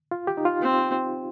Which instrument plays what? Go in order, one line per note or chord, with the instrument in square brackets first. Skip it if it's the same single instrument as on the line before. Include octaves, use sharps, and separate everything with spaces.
[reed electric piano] F4
G4
D#4
F4
[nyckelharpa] C4